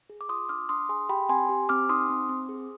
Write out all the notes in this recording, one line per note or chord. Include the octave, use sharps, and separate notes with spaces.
G#4
D6
F4 C6 D#6
D4 D6 F6
D4 C6 D#6
G#4 G#5 C6
G4 G5 B5
C4 G#5 C6
G4
C4 D6 F6
D#4 C6 D#6
C4
C4
G#4